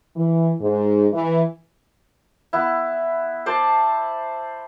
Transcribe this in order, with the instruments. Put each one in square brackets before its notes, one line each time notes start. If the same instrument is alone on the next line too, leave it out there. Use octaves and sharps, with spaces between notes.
[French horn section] E3
G#2
E3
[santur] B3 E4
C5 D5 A5